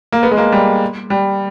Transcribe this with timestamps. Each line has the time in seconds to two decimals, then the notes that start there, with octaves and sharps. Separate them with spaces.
0.12 A#3
0.23 B3
0.31 G#3
0.38 A#3
0.52 G3
1.10 G3